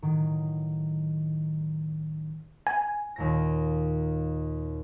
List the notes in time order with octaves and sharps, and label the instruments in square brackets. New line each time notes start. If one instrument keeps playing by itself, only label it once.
[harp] A2 D#3 F#3
[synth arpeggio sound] G#5
[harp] D#2 A#2 A#6